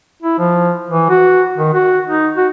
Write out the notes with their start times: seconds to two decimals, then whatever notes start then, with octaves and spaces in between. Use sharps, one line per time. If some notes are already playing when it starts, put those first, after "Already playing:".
0.22 E4
0.39 F3
0.90 E3
1.09 F#4
1.57 D#3
1.74 F#4
2.10 D#4
2.37 F#4